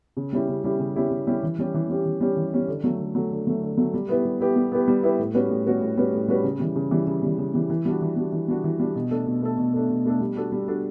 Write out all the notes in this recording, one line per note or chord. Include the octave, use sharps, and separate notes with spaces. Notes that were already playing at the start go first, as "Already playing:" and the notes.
C#3
G3 C#4 E4 G4
C#3
G3 C#4 E4 G4
C#3
G3 C#4 E4 G4
C#3
G3 C#4 E4 G4
E3
G3 C#4 G4
E3
G3 C#4 G4
E3
G3 C#4 G4
E3
G3 C#4 G4
D3
F#3 A3
D3
F#3 A3
D3
F#3 A3
D3
F#3 A3
G3
B3 E4 G4 B4
G3
B3 E4 G4 B4
G3
B3 E4 G4 B4
G3
B3 E4 G4 B4
A2
G3 C#4 F#4 B4
A2
G3 C#4 F#4 B4
A2
G3 C#4 F#4 B4
A2
G3 C#4 F#4 B4
C#3
E3 G3
C#3
E3 G3
C#3
E3 G3
C#3
E3 G3
E3
G3 D4 F#4
E3
G3 D4 F#4
E3
G3 D4 F#4
E3
G3 D4 F#4
B2
A3 D4 A4
B2
A3 D4 A4
B2
A3 D4 A4
B2
A3 D4 A4
G3
D4 F#4 A4
G3
D4 F#4 A4